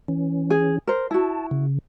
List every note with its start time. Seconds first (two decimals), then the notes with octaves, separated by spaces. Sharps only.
0.08 E3 C#4
0.50 G#4
0.87 A#4 C5
1.11 E4 F#4 A5
1.51 C#3